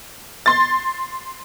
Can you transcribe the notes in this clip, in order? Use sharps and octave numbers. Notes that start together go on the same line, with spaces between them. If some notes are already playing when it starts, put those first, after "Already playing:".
C6 A6